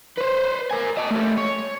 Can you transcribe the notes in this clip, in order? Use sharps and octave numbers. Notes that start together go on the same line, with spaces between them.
B4 C5
A#4 G#5
D#5 A5
A3 G4
C#5